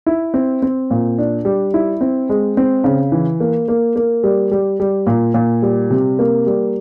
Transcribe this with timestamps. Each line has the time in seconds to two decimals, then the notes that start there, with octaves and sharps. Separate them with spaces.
0.06 E4
0.34 C4
0.62 C4
0.91 A#2
1.18 D4
1.45 G3
1.74 E4
2.01 C4
2.30 G#3
2.57 C4
2.84 C#3
3.12 E3
3.40 A#3
3.68 A#3
3.96 A#3
4.24 G3
4.52 G3
4.80 G3
5.07 A#2
5.34 A#2
5.62 G3
5.90 C3
6.19 A#3
6.47 G3